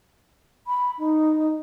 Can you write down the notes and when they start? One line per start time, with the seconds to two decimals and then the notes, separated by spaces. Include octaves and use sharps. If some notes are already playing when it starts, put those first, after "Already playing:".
0.67 B5
0.99 D#4